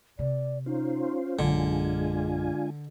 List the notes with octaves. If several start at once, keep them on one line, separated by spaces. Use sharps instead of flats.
C3 D5
C#4 D#4 F4 C5
A#1 F#2 D3 G#3 D4 F4 G#5